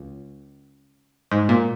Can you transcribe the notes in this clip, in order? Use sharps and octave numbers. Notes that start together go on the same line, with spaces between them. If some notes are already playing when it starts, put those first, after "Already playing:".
Already playing: C#2
G#2
A#2